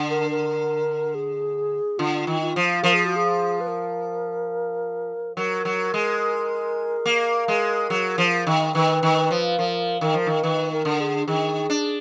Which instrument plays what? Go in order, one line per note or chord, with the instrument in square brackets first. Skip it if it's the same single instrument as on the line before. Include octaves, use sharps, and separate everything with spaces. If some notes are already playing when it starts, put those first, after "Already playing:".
Already playing: [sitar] D3
[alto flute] A#4
A#4
G#4
[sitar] D3 [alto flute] F4
[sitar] D#3
[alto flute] F4
[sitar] F3
[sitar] F3 [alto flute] A#4
[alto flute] G#4
F#4
G#4
B4
A#4
[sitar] F#3 [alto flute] A#4
[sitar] F#3
G#3
A#3
G#3
F#3
F3
D#3
[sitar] D#3 [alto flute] B4
[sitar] D#3
F3
[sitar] F3 [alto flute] A#4
[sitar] D#3 [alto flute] A#4
[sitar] F3
D#3
[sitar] D#3 [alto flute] B4
[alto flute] A#4
[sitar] D3
[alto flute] G#4
[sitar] D#3 [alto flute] G#4
[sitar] D4